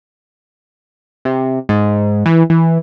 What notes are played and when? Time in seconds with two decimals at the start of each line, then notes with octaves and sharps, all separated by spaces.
1.25 C3
1.69 G#2
2.26 E3
2.50 E3